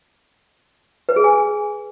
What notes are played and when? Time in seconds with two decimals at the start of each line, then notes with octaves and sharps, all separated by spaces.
1.09 B4
1.16 G#4
1.24 G#5